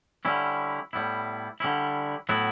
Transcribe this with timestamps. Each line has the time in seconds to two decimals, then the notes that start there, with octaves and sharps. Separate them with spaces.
0.25 D3 G3 C#4 E4
0.93 A2 G3 B3 E4
1.60 D3 G3 C#4 E4
2.29 A2 F#3 B3 E4